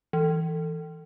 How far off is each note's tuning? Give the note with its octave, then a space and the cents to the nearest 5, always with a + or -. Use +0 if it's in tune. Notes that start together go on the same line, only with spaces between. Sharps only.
E3 -15